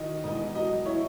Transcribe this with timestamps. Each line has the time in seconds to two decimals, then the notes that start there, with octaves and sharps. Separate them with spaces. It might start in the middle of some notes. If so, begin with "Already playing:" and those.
Already playing: D#3 F#3 D#5
0.24 E1 D#5
0.55 F#3 D#5
0.86 E4 C#5